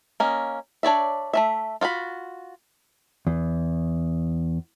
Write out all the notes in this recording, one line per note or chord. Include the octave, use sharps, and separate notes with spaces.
A#3 C#4 D#5
D4 C#5 D5 E5
A3 C#4 E5
F4 F#4 C5 B5
E2